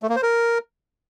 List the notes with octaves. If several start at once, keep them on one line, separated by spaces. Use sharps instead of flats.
A3
A#3
C5
A#4